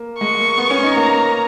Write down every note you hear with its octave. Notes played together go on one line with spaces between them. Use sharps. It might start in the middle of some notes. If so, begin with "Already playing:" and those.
Already playing: A#3
G#3 C#6
A#3
B3
C#4
D#4
A#3 A#5